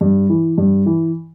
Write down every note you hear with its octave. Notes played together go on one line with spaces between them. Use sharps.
G2
E3
G2
E3